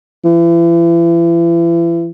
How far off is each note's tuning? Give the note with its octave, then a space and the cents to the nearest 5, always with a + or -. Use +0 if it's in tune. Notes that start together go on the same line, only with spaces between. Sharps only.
E3 +40